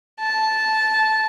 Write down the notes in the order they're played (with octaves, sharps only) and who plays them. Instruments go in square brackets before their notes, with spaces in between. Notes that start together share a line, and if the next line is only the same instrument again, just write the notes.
[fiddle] A5